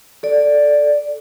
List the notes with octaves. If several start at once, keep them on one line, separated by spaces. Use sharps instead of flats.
A4 D5